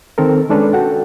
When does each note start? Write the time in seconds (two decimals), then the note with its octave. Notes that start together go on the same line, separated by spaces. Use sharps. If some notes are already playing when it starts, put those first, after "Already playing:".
0.18 D#3 C4 A4 A#4
0.49 G#3 C#4 D4 A4 B4 C#5
0.73 F#4 A4 F#5 G5